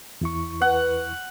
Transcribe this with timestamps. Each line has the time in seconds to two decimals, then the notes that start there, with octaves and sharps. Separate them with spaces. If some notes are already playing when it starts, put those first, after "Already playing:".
0.21 E2 E4 C#6
0.61 B4 F#5